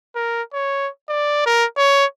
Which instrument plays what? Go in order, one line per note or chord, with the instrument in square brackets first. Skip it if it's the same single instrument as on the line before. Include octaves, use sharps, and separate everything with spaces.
[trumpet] A#4
C#5
D5
A#4
C#5